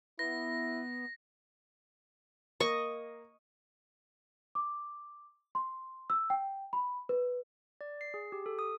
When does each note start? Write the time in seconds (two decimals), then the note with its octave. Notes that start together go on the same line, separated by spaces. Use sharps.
0.19 B3 E4 A#6
2.60 A#3 D#5 C#6
4.55 D6
5.55 C6
6.10 E6
6.30 G5
6.73 B5
7.09 B4
7.81 D5
8.01 C7
8.14 G#4
8.32 G4
8.46 A4
8.59 D#6